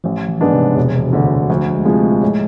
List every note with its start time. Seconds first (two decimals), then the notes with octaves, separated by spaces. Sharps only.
0.04 A1 F3
0.28 E3
0.41 G#2 G#3 B3 D4
0.53 C3
0.76 E1 B2
1.13 D2 D3
1.50 D2 F3
1.74 G#3
1.85 C3 F3 G#3
1.98 A3
2.22 A2 G#3